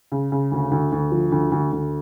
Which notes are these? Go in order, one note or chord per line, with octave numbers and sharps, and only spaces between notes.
C#3
C#3
D2
D2
D2
F3
D2
D2
D2